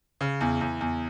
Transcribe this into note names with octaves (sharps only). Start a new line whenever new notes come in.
C#3
E2
E2
E2